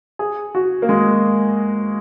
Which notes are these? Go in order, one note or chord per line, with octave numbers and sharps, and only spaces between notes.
G#4
F#4
A#3
G#3